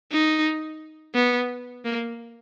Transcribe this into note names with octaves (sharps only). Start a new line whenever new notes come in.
D#4
B3
A#3